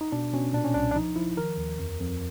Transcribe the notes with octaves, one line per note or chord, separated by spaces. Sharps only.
D#4
B2 D4
B2 C#4
A#2 D4
C#4
C2 D4
D4
F3 D#4
F3 E4
D#3 A#4
D#2
F2
F2